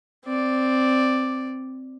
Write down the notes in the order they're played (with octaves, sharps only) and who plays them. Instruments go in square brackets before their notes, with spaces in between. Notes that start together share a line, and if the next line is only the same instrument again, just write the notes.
[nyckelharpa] C4 D5